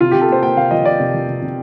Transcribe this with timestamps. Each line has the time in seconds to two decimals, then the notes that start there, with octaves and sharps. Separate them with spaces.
0.01 C3 F4
0.11 C3 G4
0.21 A4
0.28 A#3 C5
0.43 A#3 G5
0.57 C3 F5
0.71 F3 D#5
0.85 C3 D5
1.00 C3
1.14 F3
1.28 C3
1.42 C3